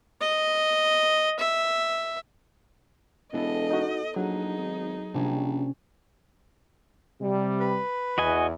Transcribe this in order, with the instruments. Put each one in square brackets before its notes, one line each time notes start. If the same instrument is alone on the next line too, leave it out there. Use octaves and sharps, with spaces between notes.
[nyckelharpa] D#5
E5
[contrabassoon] E1 [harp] B3 E4 A4 [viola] D#5
[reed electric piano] D#4 F#4
[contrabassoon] A#1 [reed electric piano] F#3 [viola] D#4 G#4 [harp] F#5
[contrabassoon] G#1
[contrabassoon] A#1 [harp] C3 G3 C#4
[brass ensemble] C3 G3
[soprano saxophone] B4
[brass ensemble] E2 [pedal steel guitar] F#4 D#5 G#5